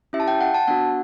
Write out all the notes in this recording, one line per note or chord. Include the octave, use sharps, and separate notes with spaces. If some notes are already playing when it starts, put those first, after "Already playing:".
C#4 E4 G4 E5
A5
G5
F#5
A5
B3 D4 F#4 F#5